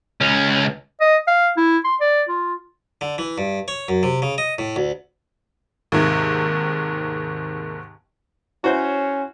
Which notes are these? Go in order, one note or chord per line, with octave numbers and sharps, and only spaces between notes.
C#2 C#4
D#5
F5
E4
C6
D5
F4
D3
E3
G2
C#5
F#2
C3
C#3
D#5
A2
D2
D#2 G#2 C3 D#3 E5 G#6
C#4 E4 F#4 C5 C#5 E5